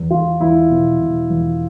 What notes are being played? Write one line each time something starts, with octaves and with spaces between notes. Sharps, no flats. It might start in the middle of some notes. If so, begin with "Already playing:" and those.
Already playing: E2
E2 F4
E2 E4
B2
B2
E2